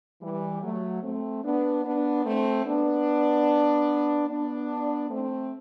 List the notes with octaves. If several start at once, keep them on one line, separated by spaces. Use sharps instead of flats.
E3 G3
F#3 A3
A3 C4
B3 D4
B3 D4
A3 C4
B3 D4
B3 D4
A3 C4